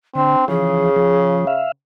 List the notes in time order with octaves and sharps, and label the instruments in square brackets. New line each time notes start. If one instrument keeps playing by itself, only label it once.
[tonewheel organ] D3 [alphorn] C4 [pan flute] D4
[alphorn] C#3 [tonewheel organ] E3 F3 [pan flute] G#4
[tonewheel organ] F3
E5 F5